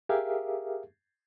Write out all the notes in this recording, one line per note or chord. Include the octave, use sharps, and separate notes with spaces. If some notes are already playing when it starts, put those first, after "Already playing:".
G4 G#4 A#4 E5 F5